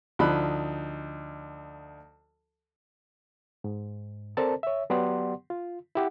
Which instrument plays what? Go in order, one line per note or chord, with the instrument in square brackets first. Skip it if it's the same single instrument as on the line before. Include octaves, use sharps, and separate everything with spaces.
[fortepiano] D2 F3 D#4 D#5 B5 F#6
[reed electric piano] G#2
C4 A4 A#4 C5 D5 A5
C#5 E5
F#3 B3 G4 D5 F#5 C6
F4
E4 G4 F#5